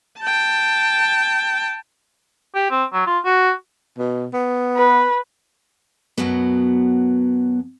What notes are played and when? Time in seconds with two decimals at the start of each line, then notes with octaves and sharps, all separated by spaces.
0.20 G5 A5
2.55 G4
2.71 C4
2.93 F#3
3.06 F4
3.25 F#4
3.98 B2
4.33 B3
4.76 B4
6.18 F#2 B2 F#3 B3